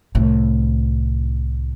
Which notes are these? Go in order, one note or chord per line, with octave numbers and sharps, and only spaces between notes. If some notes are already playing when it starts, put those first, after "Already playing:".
C2 A2